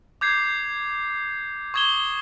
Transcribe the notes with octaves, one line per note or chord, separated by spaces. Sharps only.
D6 G6 G#6 C7
C#6 D#6 G#6 E7 G7